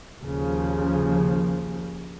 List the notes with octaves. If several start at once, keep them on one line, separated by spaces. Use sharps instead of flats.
D#2 C#3 F3